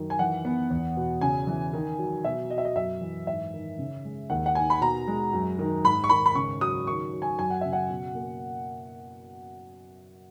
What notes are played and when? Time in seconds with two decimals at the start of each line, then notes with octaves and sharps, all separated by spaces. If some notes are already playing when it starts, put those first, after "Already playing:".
Already playing: F#2 D#3
0.10 G#5
0.19 E3 F#5
0.45 B3
0.70 E2
0.97 B2
1.21 C#3 G#5
1.47 E3
1.73 D#3
1.99 F#3
2.24 B2 E5
2.50 F#3 D#5
2.58 E5
2.65 D#5
2.76 F#2 E5
3.01 E3
3.27 G#2 E5
3.54 D#3
3.79 C#3
4.05 G#3
4.30 D#2 F#5
4.46 F#5
4.55 D#3 G#5
4.70 B5
4.81 B2 A#5
5.08 G#3
5.33 F#2
5.59 D#3
5.84 G#2 B5
6.04 C#6
6.09 D#3 B5
6.26 B5
6.35 C#3 C#6
6.61 F#3 D#6
6.87 D#3 C#6
7.13 F#3
7.22 G#5
7.38 F#2 G#5
7.50 F#5
7.61 C#3 E5
7.73 F#5
7.90 B2
8.15 A#3